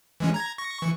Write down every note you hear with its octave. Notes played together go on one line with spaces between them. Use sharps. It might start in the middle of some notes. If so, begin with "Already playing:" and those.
E3 G#3 C#4
A#5 G#6
C#6 A#6
E3 C#6